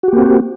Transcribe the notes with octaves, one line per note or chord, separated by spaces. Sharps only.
A#3 C4 F#4 G4